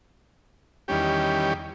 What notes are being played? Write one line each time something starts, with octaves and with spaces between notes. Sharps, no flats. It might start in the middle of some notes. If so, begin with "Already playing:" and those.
E2 D#3 G3 C#4 G4